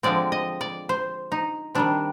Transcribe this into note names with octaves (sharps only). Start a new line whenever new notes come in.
D3 F3 G#3 C4 D5
D#5
D5
C5
D#4
D#3 G3 C4 D4